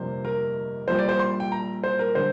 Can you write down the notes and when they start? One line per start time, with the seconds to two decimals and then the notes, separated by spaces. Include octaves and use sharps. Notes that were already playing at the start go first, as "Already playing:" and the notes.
Already playing: G1 F2 C3 A#3 D4 C5
0.25 A#4
0.88 A#1 A#2 G3 C5
0.99 D5
1.09 C5
1.19 C6
1.40 G5
1.52 A#5
1.84 C5
1.99 A#4
2.15 D3 G3 C5